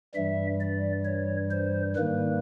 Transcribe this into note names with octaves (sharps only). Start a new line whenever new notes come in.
G2 E3 G3 E5
D5
C#5
C5
G#2 D#3 G3 A#3 B4